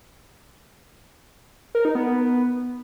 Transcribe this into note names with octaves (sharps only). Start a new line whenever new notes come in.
A#4
D#4
B3